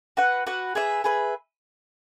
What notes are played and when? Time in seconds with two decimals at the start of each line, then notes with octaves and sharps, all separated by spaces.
0.17 F#4 B4 F#5
0.46 F#4 B4 F#5
0.75 G#4 B4 E5
1.04 G#4 B4 E5